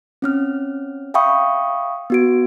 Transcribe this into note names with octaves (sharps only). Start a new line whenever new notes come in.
C4 C#4 F6
E5 F5 G5 B5 C#6 D#6
B3 F#4 D7